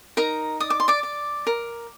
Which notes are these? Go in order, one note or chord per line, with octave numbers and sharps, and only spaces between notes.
D#4 A#4 A#5
D5 D#6
D6
C6
D5 D6
D5
A#4